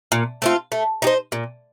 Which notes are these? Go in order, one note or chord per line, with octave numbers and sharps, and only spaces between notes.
A#2
A3 C4 F4
A3
D#4 G4 C5
A#2